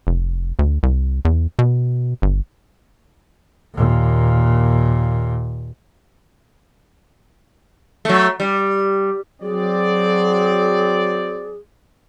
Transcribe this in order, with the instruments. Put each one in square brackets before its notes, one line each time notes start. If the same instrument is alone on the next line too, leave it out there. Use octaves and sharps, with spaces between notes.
[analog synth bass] F1
D2
C2
E2
B2
G1
[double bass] D#2 A#2
[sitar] F#3 A3
G3
[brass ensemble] F#3 C4 D5 [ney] G#4